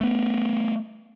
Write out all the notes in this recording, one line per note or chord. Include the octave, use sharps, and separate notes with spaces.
A3 B3